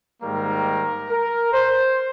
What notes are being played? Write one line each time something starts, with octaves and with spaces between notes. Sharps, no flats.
G#2 D#3 G3 A#3 A#4
A#4
C5